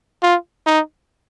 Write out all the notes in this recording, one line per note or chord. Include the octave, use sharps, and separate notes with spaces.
F4
D#4